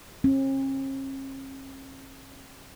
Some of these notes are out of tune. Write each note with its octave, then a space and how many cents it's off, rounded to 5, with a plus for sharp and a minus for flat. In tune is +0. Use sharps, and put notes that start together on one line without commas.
C#4 -45